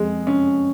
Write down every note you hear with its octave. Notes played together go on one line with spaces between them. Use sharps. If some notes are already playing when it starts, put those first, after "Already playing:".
Already playing: F2 G#3
C#4